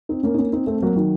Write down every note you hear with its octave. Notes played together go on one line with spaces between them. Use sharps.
C4 D#4
A#3 C#4
D#4
A#3 C#4
C4 D#4
A3 C4
C4
F#3 A#3
D#3 F#3